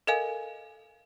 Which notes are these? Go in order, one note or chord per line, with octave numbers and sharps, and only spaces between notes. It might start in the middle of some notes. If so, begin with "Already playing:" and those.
A4 A#4 D#5 F5 G#5